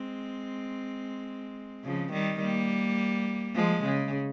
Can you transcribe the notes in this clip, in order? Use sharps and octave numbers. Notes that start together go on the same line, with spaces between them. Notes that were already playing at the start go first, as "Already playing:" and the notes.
Already playing: G#3 C4
C#3 F3
D#3 G3
G3 A#3
F3 G#3
C#3